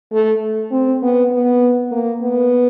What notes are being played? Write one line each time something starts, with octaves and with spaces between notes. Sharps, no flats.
A3
C4
B3
B3
A#3
B3